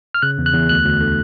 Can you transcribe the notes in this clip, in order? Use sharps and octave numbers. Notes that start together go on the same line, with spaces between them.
F6
C#3 F#6
E2
F#6
E2
D2 F#6
D2
D3